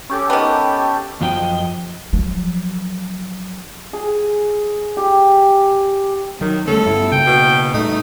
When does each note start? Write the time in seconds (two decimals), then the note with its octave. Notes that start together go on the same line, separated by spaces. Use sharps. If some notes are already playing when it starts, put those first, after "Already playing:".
0.10 C#4 G4 A4
0.30 D#3 B3
1.21 F#2 F3 D#5 G5
2.13 F3 F#3
3.93 G#4
4.97 G4
6.41 D#3 F#3
6.68 D3 G3 A3 C#4 A4
6.86 G2 B3 E4
7.12 C#3 A#3 G5
7.27 B2
7.74 A2 G3 A3 D#4